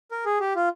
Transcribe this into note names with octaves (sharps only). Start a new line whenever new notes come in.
A#4
G#4
G4
F4